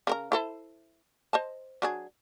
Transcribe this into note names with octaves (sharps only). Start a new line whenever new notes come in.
C#3 A#4 A#5
E4 A4 C5
C5 D#5 A5
F#3 D4 G#4